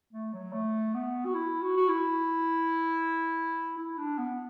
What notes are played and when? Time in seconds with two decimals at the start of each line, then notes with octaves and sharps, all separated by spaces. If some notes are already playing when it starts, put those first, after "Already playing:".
0.13 A3
0.33 F#3
0.53 A3
0.94 B3
1.25 F#4
1.34 E4
1.62 F#4
1.77 F#4
1.89 E4
3.78 E4
3.98 D4
4.18 B3